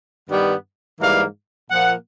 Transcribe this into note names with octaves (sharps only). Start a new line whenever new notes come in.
G2 D#3 G3 B3
G#2 E3 G3 A#3 F5
A#2 F3 A#3 F#5